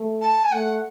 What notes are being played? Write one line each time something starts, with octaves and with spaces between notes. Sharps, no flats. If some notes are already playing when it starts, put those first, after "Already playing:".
Already playing: A3
A5
G#5
A3 F#5